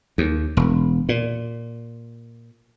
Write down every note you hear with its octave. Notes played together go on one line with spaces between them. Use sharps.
D#2
E1
A#2